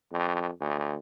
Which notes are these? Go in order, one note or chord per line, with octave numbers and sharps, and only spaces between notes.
F2
D2